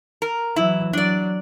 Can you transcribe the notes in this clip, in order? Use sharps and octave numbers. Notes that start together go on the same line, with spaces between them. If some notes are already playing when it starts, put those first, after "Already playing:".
A#4
E3 F#3 E4
F#3 D4 D5